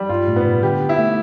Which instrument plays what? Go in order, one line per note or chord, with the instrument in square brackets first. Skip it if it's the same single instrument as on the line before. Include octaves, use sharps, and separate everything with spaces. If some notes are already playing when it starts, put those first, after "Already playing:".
Already playing: [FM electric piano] F3 [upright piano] G3
[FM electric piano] G2 [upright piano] F4
[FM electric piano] A2
[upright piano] B3
[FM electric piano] B2
[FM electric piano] D3 [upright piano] G4
[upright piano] E4
[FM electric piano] A3